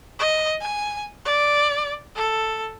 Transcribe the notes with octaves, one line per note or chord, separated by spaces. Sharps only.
D#5
G#5
D5
A4